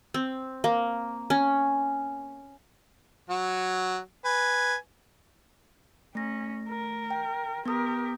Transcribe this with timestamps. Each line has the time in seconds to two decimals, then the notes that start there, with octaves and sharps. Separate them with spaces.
0.14 C4
0.64 A#3
1.30 C#4
3.29 F#3 F#4
4.25 B4 G#5
6.15 A3 C#4 A#6
6.69 A#4
7.11 G5
7.66 B3 G4 A#4 D#6